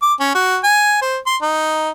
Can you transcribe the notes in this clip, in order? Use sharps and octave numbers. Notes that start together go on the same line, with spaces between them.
D6
C#4
F#4
G#5
C5
C6
D#4